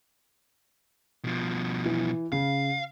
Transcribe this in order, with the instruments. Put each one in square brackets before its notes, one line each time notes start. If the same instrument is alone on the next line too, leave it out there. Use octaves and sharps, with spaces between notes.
[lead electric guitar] B2 F3
[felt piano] E3
[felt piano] C#3 [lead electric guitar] F5